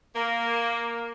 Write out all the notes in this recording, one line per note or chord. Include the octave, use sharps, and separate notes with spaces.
A#3